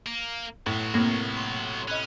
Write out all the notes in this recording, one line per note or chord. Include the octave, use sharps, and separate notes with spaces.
A#3
A2 F#3 B3
A2 C3 A#3 G#6 C7
C6
C#4 D#5 B5 F#6